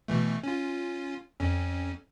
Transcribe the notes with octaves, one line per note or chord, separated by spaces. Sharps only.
B2 E3 A3
C#4 F4
F2 C#4